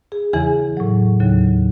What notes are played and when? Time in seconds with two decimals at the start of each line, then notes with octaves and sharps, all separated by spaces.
0.12 G#4
0.33 E2 C#3 E3 G#4
0.77 A2 F#3
1.20 D#2 C#3 F#3